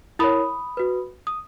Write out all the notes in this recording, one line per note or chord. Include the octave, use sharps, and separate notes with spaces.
E4 A#4 C#5 B5 D#6
F#4 B4
D#6